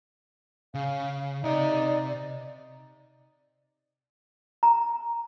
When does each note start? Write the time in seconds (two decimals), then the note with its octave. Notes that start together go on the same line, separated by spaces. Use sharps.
0.75 C#3 F5
1.44 C3 D#4 D5 E5
4.63 A#5